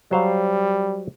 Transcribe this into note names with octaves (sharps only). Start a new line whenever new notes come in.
F#3 G3 C5 F5